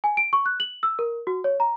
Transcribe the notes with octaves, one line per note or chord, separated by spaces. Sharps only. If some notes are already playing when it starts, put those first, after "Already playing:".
G#5
D7
C#6
F#6
F#7
E6
A#4
F#4
C#5
A#5